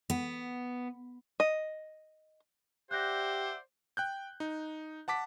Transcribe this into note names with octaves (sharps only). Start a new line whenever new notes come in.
B3
D#5
G4 C5 D5 E5 F#5 F#6 G6 A#6
G5 F#6 G6
D#4
F#5 A5 D6 B6